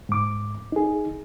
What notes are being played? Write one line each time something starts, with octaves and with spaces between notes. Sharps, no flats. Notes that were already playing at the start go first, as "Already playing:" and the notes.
G#2 D6
D#4 G#4